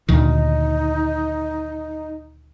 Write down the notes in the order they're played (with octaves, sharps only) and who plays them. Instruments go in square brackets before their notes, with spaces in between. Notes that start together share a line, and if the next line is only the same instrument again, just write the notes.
[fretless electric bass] D2 A#2 D#3 [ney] D#4